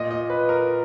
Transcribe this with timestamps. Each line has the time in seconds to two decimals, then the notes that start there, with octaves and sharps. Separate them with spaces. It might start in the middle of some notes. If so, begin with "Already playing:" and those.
Already playing: A#2 D#5
0.11 D#5
0.30 B4
0.49 A#4